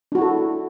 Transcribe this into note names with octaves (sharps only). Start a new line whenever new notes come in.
D4 E4 F#4 A4